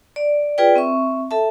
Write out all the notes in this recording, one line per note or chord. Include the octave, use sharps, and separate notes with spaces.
D5
F4 G#4 B4 D5 G5
C4 E5 C#6
A4 E5 A5